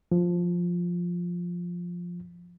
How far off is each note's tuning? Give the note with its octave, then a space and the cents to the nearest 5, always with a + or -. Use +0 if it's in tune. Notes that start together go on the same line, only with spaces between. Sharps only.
F3 +5